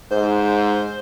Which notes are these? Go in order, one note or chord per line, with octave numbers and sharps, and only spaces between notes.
G#2 C5